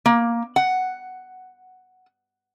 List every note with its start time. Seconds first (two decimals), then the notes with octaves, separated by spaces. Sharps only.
0.06 A#3
0.56 F#5